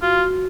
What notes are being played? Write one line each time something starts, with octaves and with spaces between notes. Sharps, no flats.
F4 F#4